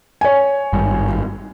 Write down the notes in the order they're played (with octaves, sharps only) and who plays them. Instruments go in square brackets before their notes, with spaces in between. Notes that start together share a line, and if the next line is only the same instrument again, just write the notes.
[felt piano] C#5 G#5
[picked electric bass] G#1 G2